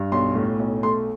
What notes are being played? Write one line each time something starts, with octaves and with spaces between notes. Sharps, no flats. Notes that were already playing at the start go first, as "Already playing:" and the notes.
Already playing: G2
B1 C6
A2
B1
A3 C6